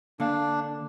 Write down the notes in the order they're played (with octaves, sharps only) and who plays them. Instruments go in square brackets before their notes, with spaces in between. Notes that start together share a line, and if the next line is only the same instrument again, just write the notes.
[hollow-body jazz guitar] D3 A#3 F5 [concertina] D4